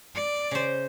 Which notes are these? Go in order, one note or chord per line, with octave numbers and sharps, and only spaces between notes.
D5
C#3 C5